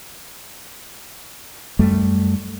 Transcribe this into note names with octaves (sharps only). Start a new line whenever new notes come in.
F#2 G3 A3